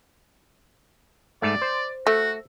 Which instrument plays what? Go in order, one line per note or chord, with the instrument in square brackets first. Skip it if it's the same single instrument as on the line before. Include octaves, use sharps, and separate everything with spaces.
[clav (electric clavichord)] G#2 A3 [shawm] D5
[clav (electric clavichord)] C5
[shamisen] A3 [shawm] F#4